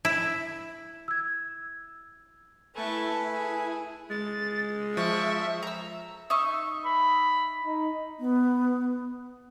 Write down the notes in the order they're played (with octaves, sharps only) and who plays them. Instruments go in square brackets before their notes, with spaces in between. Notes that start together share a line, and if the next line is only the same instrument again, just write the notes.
[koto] E4
[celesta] E6 G#6
[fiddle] A3 C#6 [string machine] E4 [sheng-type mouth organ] A4 B4 G#5
[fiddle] G#4
[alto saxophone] G#3 [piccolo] A6
[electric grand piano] F3 [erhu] E5 [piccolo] C#6
[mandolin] A#5 E6
D#4 E5 C#6
[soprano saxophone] B5
D#4
[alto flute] B3